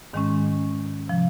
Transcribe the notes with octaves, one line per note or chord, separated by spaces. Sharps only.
G#2 D#3 G#3 C#4
C3 F3